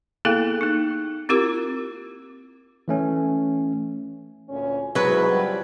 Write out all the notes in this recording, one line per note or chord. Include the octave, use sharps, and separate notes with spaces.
A#3 B3 E4 G#4 A4 F5
A#3 D#4
C4 E4 F4 G4 A#4 D6
E3 A3 C#4
D2 A#2 C#4
E2 G#2 F#3 B4
C#3 F3 G3